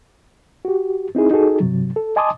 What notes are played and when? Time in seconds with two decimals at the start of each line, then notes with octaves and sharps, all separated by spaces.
0.65 F#4 G4
1.15 C4 D#4 E4 G#4
1.31 D#4 F#4 G#4 A4
1.60 G2 C3 F#3
1.96 A4
2.16 D#5 G#5 A5 C6 D6 D#6